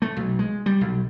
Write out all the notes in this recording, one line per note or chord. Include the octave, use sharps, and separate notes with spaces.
A3
B1
G#3
G3
B1